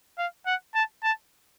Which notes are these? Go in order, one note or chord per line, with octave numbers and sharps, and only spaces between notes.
F5
F#5
A5
A5